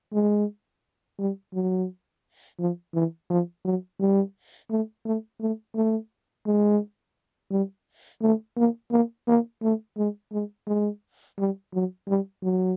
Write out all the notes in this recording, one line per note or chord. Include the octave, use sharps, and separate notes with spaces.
G#3
G3
F#3
F3
E3
F3
F#3
G3
A3
A3
A3
A3
G#3
G3
A3
A#3
A#3
A#3
A3
G#3
G#3
G#3
G3
F#3
G3
F#3